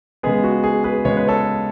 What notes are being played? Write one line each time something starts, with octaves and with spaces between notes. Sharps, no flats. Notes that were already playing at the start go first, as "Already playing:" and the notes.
C#3 G#3 B3 G#4
F#4
G#4
G#4 B4
C#3 G#3 B3 C#5
B4
A4 C#5